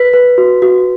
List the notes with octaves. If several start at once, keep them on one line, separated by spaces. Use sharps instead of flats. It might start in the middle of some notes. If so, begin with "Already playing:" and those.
Already playing: B4 B6
B4
F#4
F#4